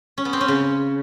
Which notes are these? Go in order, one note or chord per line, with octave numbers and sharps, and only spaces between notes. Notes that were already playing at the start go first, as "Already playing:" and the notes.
C#4
B3
C4
C#4
C#3